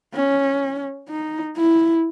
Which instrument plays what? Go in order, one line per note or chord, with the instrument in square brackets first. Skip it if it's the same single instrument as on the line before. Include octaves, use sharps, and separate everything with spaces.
[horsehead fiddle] C#4
D#4
E4